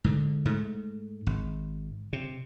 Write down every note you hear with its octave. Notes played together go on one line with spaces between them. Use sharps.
G#2 D3
G#2 A3
G#1
C3